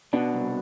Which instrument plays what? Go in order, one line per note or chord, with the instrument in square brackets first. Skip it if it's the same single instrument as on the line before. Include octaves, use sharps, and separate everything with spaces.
[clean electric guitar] B2 [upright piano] B3 D4
[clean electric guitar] C2